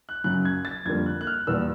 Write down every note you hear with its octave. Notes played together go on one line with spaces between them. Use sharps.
F#6
F#2 C#3 F#3 F#6
G#6
A6
F2 D3 G3 A#3 G#6
F#6
F#6
F6
E2 B2 G3 A#3 E6